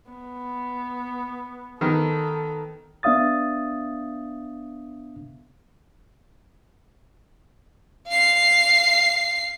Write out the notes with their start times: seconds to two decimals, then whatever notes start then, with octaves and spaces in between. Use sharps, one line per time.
0.11 B3
1.81 D#3 B3 D#4 A4
3.03 B3 D4 E5 F5 D#6 A6
8.08 F5 C7